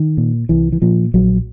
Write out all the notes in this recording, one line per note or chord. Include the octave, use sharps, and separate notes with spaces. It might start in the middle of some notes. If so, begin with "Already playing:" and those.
Already playing: D#3
A#2
C2 E3
E3
A#2 F3
A#1 F#3